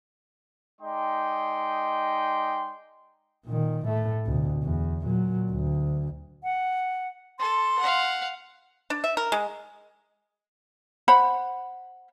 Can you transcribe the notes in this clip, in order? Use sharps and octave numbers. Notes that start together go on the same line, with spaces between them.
G#3 D#4 D5 D#5 G5 C6
A#2 D#3
A2 A3
D2 B2
E2
A#2 F#3
D2
F#5
A4 C6
F5 F#5
D4
E5
A#4
G#3
C5 F#5 B5